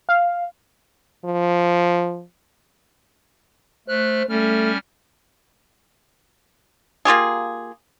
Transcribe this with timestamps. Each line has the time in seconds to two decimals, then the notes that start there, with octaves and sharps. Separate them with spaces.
0.09 F5
1.25 F3
3.88 A3 C5 F6 F#6
4.29 G3 A3 C#4 F6
7.05 A#3 F4 G4 G#4